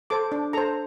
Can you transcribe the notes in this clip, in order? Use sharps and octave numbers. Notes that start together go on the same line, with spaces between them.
A4 C5 D6
D4
A4 C5 A#5